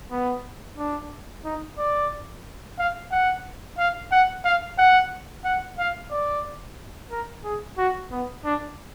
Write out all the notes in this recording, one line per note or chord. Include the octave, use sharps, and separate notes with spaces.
B3
D4
D#4
D5
F5
F#5
F5
F#5
F5
F#5
F#5
F5
D5
A#4
G#4
F#4
B3
D4